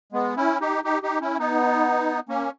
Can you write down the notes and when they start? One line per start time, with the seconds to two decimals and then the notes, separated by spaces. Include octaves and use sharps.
0.12 G#3 B3
0.36 C#4 E4
0.60 D#4 G4
0.84 D#4 G4
1.03 D#4 G4
1.21 C#4 E4
1.39 B3 D#4
2.29 A#3 C#4